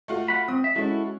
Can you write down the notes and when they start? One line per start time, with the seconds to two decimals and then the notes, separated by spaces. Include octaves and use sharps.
0.08 A3 F4 F#4
0.28 F#5 B5
0.48 C4 D#6
0.64 E5
0.75 G#3 C#4 E4 F#4 A4